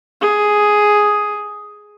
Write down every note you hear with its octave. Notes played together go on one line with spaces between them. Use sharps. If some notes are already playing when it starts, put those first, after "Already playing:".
G#4